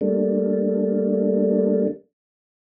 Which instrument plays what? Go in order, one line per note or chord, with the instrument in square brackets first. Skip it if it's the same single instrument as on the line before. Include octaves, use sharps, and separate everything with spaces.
[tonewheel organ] G3 A3 A#3 D4